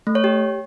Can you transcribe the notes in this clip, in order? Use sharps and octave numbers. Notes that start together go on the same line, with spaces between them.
A3
C#5
G4